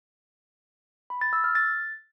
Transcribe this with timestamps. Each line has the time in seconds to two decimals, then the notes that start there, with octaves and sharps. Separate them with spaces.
1.10 B5
1.21 A6
1.33 E6
1.44 F6
1.55 A6